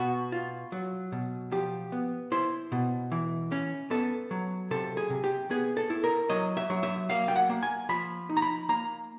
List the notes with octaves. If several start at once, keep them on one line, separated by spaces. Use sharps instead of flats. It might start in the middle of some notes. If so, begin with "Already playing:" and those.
Already playing: B2 F#4
F4
F#3
B2
F3 G4
B3
E4 C5
B2
E3
C#4
B3 A4
F#3
C3 A4
G#4
C3
G4
B3 G#4
A4
E4
A#4
F#3 D#5
E5
F#3
E5
A#3 F5
G5
F#5
A#3
G#5
F3 B5
D#4
A#5
B5
A#3 A#5